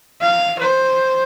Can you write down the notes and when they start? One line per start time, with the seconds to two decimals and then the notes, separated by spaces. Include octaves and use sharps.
0.21 F5
0.59 C5